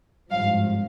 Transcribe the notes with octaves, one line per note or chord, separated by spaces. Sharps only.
G#1 G2 F3 F5